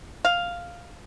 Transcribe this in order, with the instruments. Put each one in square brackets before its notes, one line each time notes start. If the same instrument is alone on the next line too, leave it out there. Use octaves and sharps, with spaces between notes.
[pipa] F5